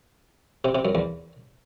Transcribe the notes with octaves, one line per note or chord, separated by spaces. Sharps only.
C3
C3
F#2
E2